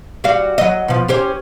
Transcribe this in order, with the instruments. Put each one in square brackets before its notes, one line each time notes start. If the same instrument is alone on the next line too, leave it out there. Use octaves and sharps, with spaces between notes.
[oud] G3 F#4 F5
F#3 D#5
B2 F3
C#4 G4 C5